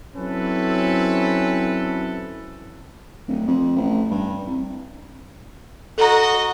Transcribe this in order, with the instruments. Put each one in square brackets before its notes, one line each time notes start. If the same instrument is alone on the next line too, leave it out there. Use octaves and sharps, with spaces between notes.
[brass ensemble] F#3 C4 C#4 E4 A4 B4
[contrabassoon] D1
F2
A1
G2
C2
[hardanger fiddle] F#4 D#5 [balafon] A4 A#5